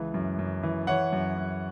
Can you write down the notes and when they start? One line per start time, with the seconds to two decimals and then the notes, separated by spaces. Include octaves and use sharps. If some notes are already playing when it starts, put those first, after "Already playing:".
Already playing: C#2 E3
0.14 F#2
0.39 F#2
0.63 E3
0.87 E3 C#5 F#5
1.12 F#2
1.37 F#2